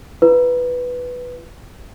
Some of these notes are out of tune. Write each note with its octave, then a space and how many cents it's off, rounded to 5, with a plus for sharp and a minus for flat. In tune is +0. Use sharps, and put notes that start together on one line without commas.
F4 -45 B4 +0